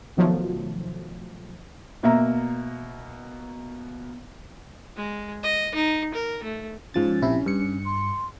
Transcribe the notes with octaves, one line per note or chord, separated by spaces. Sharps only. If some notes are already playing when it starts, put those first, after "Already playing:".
B2 D#3 F3 F#3 A3
B2 A#3 E5 A#5
G#3
D#5
D#4
A#4
A3
G#2 F3 C#4 A6
A#1 C3 E4
G2 C#7
C6